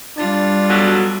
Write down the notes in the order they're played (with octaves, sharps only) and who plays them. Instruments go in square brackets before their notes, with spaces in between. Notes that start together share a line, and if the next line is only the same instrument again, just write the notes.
[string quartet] G3 F4 A6 [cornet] D4
[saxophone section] B2 D3 F#3